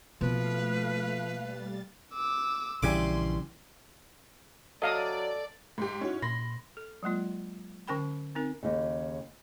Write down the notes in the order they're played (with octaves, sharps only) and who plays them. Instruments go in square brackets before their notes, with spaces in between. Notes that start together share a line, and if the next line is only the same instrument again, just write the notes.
[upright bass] B2 A#3 [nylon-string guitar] F3 [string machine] A3 F5 [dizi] B4
[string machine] G3 A6
[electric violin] D6 E6
[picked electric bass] A#1 C#3 E3 [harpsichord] G3 G#5 D6 [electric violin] C6
[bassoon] F#3 [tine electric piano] A4 [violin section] D5 [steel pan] D#5 F5 D#6
[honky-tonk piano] G#2 G4
[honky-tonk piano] C#4 [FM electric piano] D#4 E4 F#4
[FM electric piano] A#2 [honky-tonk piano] B5 C6 A#6
[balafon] A4
F#3 G#3 A#3 F4
D3 C#4 A#4 G5 B5
C4 D#4 A#4
[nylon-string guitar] D#2 C#3